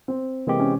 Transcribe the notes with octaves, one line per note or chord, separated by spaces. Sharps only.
C4
C3 E3 G#3 A#3 C4 G4
C#4